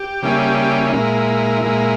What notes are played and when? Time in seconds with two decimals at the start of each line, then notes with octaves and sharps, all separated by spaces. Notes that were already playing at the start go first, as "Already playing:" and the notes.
Already playing: G4
0.22 C#3 G3 A#3 C#4 E4
0.93 A#2 G#3 E4 A#4
1.62 A#2 G#3 E4